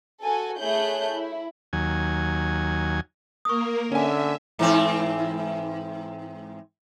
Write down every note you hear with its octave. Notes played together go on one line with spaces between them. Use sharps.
F#4 A4 G#5
A3 E4 G#4 C#5 F#6 G6
E4
D#2 F#3 G#5
A#3 A#4 C#6 D#6
D3 C#4 E5 G#5
G#2 E3 C4